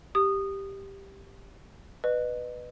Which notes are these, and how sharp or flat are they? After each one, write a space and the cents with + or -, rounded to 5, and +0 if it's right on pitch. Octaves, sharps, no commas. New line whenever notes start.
G4 +0 D#6 -20
B4 +0 D#5 -35